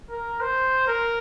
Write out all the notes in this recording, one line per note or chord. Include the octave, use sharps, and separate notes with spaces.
A#4
C5
A#4